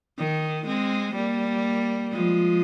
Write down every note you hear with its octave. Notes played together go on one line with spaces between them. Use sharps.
D#3
G#3 C4
G3 A#3
F3 G#3